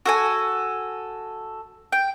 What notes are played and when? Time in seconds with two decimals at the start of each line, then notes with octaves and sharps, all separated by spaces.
0.05 F#4 A4 G#5
1.92 G5